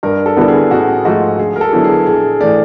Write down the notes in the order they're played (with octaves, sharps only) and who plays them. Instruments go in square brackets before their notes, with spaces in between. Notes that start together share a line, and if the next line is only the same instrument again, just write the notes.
[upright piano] G2 [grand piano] A#4
[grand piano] A4
[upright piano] D3 G3 B3 E4 [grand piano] A4
[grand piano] G#4
[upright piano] A1 [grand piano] F#4
[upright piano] G#2 F3 A3 [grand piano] F#4
[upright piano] D2 [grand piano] G#4
[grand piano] A#4
A4
[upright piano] D3 F#3 B3 E4
[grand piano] G#4
[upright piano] A#1 [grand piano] G#4
[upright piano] A2 E3 A3 [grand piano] D5